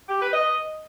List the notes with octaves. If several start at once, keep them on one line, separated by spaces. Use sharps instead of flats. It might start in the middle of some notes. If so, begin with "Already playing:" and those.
G4
B4
D#5